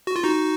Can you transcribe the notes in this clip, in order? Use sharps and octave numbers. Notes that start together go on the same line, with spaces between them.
F#4
F4
D#4 F#4